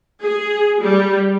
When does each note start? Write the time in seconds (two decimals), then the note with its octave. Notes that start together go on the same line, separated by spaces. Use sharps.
0.22 G#4
0.82 G3